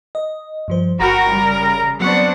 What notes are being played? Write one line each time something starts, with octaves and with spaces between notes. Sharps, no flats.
D#5
G2 F3 C5
G1 F#4 A#4 G5 A#5 B5
C#3 G3
F#3 B3 C4 D4 F#5 C#6